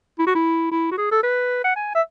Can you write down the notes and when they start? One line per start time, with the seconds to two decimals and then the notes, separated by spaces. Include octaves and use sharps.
0.19 E4
0.27 F#4
0.35 E4
0.72 E4
0.91 F#4
0.98 G#4
1.12 A4
1.23 B4
1.64 F#5
1.76 G#5
1.95 E5